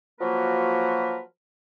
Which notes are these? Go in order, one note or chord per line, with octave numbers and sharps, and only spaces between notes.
F3 F#3 A#3 F#4 A#4 B4